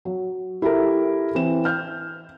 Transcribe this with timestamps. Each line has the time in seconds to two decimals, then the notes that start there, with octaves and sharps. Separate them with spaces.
0.05 F#3
0.62 E4 G4 A4 A#4 E5
1.35 E3 C4 E7
1.65 F6 G6